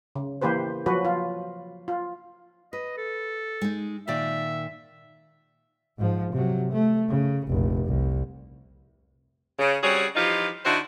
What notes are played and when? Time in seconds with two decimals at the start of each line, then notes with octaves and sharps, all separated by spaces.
0.15 C#3
0.42 E3 A#3 G4 B4 C5
0.86 F3 F#3 F#4 B4
1.05 F4
1.88 F4
2.73 B4 D#5
2.98 A4
3.61 G#3 D#4
4.08 A#2 D#3 D5 E5
5.98 G#2 F3
6.33 C3 F#3
6.73 A3
7.09 C#3
7.48 F1 A#1
7.85 C2
9.58 C#3
9.83 G3 C4 C#4 F#4 G#4
10.16 E3 F3 D#4 F4 G4
10.65 D3 D#4 E4 F#4 C5